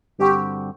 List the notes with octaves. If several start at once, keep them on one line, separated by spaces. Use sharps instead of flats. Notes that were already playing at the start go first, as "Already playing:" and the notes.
G2 D3 G3 C4 F#4 G4